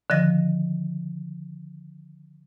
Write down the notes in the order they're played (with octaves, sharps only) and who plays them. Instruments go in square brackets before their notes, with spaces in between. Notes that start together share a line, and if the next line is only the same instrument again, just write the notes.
[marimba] D3 D#3 F3 D#5 A#6